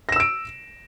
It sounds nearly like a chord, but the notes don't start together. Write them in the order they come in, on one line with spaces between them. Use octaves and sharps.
A#6 E7 E6 D7